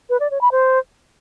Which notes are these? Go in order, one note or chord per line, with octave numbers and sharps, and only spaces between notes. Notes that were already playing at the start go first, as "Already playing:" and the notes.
B4
D5
C#5
B5
C5